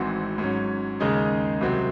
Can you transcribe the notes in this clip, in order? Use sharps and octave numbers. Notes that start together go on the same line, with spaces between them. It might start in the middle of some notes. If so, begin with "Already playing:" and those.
Already playing: G#1 G#2 E3 C4 F#4
G#2 F#3 C#4
D#2 C#3 G#3 D#4 G#4
C2 C3 F#3 C4 F#4